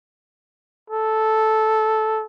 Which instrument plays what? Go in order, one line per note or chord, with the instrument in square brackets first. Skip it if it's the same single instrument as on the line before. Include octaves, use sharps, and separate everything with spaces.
[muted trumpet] A4